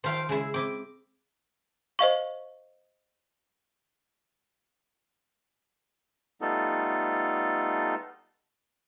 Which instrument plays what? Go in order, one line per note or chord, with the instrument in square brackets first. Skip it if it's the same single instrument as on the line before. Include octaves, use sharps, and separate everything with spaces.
[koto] D#3 F3 E5 [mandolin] C5 F5 G5
[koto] C#3 G#3 E4 [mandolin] G#4 E6
[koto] C4 E4 D#5 [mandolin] D6
[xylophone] C5 D#5 F5 C#6
[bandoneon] G3 A3 B3 D#4 F4 A4